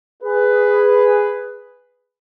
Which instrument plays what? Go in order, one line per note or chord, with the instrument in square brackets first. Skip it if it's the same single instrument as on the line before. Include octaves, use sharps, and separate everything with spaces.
[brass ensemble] G#4 B4